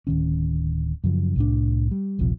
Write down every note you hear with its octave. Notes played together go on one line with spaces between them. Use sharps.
D1 D#3 C#4
F#2 C#3 F3
C2 A2 D4
G3
D#1 A#1 C3 F3